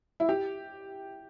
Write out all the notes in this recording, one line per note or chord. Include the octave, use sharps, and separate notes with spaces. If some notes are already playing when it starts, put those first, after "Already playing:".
E4
G4